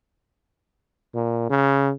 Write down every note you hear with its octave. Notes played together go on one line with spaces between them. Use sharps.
A#2
C#3